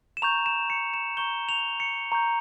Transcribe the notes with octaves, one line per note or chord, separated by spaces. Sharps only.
E7
A#5 C#6 G6 F7
E7
C#7
E7
A#5 C#6 G6 G7
F7
C#7
A#5 C#6 G6